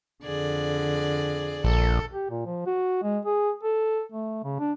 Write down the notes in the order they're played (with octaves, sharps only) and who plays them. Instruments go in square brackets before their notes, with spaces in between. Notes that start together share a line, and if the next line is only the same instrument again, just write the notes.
[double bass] F2 D3 [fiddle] G#4 D5
[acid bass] A#1 [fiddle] A4
[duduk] G4
A#2
F3
F#4
G#3
G#4
A4
A3
C#3
D4